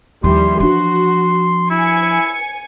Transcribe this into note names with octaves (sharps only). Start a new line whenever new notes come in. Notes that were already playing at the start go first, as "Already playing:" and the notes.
D#2 E3 F3 G3 C6
F3 D4 F#4 C6
E4 G#5 C#7